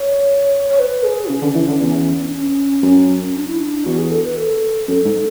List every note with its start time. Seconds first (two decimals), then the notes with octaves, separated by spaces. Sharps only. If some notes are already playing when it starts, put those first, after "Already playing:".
Already playing: C#5
0.68 C#5
0.79 B4
1.03 G#4
1.29 C#3 C#4
1.42 D3
1.55 E3
1.68 D3
1.81 E2
2.26 D4
2.32 C#4
2.83 F#2
3.35 D4
3.47 E4
3.60 D4
3.85 E2 F#4
3.98 G#4
4.11 A4
4.24 B4
4.36 A4
4.87 F#2 A4
5.05 G#2